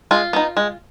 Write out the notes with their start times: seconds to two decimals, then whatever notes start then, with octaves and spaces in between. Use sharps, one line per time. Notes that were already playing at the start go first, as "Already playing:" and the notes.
0.11 G#3 F4
0.33 B3 D#4
0.57 G#3